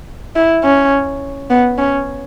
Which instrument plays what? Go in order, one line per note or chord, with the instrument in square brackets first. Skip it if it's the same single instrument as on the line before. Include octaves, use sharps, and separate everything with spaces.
[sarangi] E4
C#4
B3
C#4